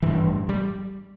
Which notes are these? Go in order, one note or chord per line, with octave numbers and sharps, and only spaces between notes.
A1 G2 E3
G3